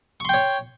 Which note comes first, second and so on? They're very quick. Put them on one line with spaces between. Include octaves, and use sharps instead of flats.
C#6 C6 G5 C#5